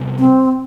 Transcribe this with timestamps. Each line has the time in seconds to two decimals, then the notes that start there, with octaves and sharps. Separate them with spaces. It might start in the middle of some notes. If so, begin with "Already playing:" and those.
Already playing: C3 G3 B3
0.19 C4